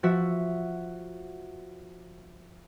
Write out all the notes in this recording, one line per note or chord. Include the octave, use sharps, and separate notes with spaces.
F3 F#4 E5